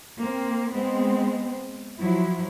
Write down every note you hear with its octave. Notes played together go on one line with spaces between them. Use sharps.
A#3 C4
G#3 B3 C4
F3 F#3 E4